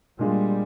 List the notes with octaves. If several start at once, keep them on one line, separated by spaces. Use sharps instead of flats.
A#2 G3 G#3 D4 F4